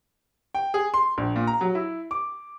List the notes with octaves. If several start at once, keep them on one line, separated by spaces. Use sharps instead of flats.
G5
G#4
C6
A#1
A#2
A#5
F#3
E4
D6